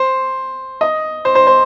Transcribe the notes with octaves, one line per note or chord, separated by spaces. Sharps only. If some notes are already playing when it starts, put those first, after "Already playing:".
Already playing: C5
D#5
C5
C5
C5